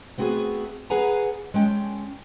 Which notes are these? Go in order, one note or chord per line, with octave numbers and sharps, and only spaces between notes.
A3 B3 C4 F4 F#4 G#4
G#4 B4 F#5 G#5 A#5
G#3 C#4 G5 A5